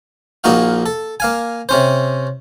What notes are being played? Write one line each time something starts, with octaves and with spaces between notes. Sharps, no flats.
A#1 A#2 A#3 D#4 F#4 F5
A4
A#3 F5 G#5
C3 C#4 C5